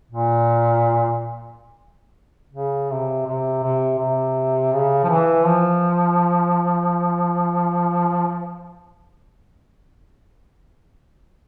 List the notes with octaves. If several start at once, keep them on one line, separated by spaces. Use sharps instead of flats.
A#2
C#3
C3
C3
C3
C3
C#3
F3
E3
F3